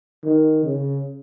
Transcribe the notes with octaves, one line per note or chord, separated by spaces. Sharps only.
D#3
C#3